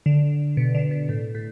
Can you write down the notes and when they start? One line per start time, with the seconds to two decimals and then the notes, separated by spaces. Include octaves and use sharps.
0.06 D3
0.57 B2
0.75 D3
0.91 B2
1.09 A2
1.35 A2